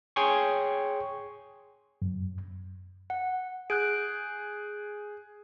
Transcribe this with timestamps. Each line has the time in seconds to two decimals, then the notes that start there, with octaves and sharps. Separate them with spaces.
0.16 G#4 C#5 G5 G#5 C6 C#6
2.02 F#2
3.10 F#5
3.70 G#4 F#6 G6 D7